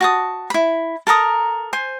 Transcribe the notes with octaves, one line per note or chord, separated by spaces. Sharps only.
F#4 A5 D#6
E4 B5
A4 A#4 A#5 D#6
C5 G#5